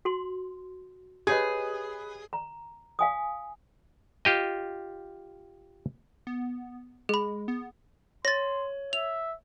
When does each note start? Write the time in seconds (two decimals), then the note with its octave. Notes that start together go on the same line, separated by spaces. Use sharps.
0.05 F#4 C6
1.27 G4 G#4 B4 C#5 D#5 G#6
2.33 A#5
2.99 F5 G#5 D#6
4.25 F4 G4 D#5
6.27 B3
7.09 G#3 G#4 B5
7.48 B3
8.25 C#5 C6 A6 A#6
8.93 E5 F7